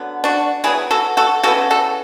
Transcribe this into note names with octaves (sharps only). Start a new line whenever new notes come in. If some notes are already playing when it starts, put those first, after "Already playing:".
Already playing: D3 F#3 B3
D4 F#4
D3 F#3 B3 E4 G#4
F#4 A4
F#4 A4
C#3 E3 B3 F#4 A4
F#4 A4